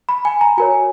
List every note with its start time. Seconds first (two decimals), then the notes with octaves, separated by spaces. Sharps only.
0.09 B5
0.25 G#5
0.41 A#5
0.57 F#4 A#4 C#5 G#5